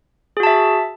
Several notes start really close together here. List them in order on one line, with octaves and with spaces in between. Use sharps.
G#4 F#4 A5 E5